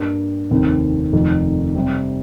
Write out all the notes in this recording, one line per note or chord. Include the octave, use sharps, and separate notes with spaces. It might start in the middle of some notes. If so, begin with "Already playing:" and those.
Already playing: G2 G3 A#3
F1 D#2 D#3 C4
F1 F2 D#3
C3 G3 C4